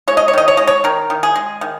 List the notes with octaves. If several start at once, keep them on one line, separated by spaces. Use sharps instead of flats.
G#3 C#5
D#5
C#5
D#3 D#5
C#5
G#3 D#5
C#5
D#3 A#4
D#3
G#4
G#3
D#3